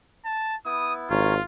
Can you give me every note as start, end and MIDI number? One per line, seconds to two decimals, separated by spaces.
0.25 0.56 81
0.65 1.09 59
0.65 1.09 64
0.65 0.93 87
1.10 1.38 32
1.10 1.35 61
1.10 1.43 65
1.10 1.35 70
1.10 1.35 73